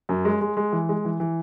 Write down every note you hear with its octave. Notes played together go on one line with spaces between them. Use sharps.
F#2
G#3
G#3
G#3
E3
G#3
E3
E3